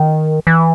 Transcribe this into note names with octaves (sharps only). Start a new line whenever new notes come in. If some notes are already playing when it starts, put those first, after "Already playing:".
Already playing: D#3
E3